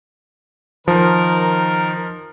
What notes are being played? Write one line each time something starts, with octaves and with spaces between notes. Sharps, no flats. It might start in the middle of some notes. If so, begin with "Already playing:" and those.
D#3 F3 A#4